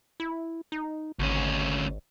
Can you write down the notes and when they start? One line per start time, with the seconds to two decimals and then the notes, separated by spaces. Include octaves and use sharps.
0.20 E4
0.72 D#4
1.19 G#1 D2 C#4